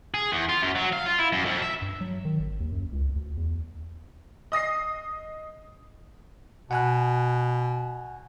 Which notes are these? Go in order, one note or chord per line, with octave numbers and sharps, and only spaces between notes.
G#4
E2
F4
F#2
F#3
F5
F4
E4
F#2
F2
E5
G2
F#3
D#3
G#1
D#2
F#2
C#2
D2
E2
D#5 D#6 A#6 C7
B2 F#5 G#5 F#6